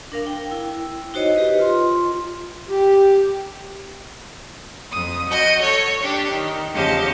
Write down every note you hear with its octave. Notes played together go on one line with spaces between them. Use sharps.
D4 A#4 F5
G5
E4 G5
D#4 F#4 C5 C#5 D#5
G4 B4 D#5
F4 C6
G4
F2 D#6
F#4 D#5 G6
A4 C#5
D4 G4
D#3
E2 C#3 F3 G4 D#5 A5